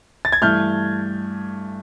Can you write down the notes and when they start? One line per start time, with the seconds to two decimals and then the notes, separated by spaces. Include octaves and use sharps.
0.25 A6
0.32 G#6
0.42 G2 E3 A3 F6 G6